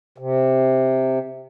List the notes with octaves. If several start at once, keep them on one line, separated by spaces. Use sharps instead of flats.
C3